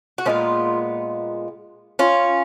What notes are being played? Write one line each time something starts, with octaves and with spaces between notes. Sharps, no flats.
F#4
A#2 G#3 B3 C#4 F4
C#4 F4